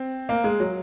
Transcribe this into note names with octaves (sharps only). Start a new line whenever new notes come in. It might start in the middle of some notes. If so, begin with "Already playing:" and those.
Already playing: C4
A#3
G#3
F#3